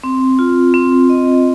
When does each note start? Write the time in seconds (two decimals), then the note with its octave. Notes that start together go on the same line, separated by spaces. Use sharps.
0.04 C4
0.39 F4
0.74 C4
1.09 D#5